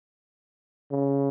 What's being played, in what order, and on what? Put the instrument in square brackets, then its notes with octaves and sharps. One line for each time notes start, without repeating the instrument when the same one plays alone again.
[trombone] C#3